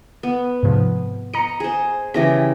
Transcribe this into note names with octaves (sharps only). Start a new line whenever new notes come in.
B3
G#2 C3 F3
D#5 A#5 C#7
G#4 C5
C#3 E3 G4 A#6